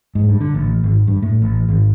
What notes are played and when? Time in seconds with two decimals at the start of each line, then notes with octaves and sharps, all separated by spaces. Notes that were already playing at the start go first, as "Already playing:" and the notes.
0.15 G#2
0.29 G2
0.40 D3
0.54 A1
0.84 G#1
1.07 G2
1.22 A2
1.42 A1
1.68 G#1